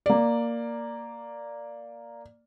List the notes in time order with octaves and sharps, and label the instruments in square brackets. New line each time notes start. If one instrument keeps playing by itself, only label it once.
[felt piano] A#3 D5